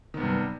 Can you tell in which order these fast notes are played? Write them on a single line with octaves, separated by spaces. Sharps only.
D#3 B3 C3 G2